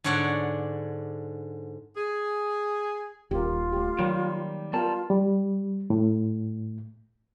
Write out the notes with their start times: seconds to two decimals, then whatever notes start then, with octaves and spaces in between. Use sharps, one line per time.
0.04 G#2 D3 C#5 D5 F#5
1.97 G#4
3.31 D#1 F4 G4 A#4
3.72 A3 G4
3.99 D#3 F#3 G3 A#3
4.73 G3 B3 F4 A#4 G5 A5
5.10 G3
5.90 A2